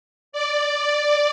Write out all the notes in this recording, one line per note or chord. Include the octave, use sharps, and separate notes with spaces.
D5
D5